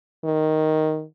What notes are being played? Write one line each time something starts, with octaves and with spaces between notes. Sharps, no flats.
D#3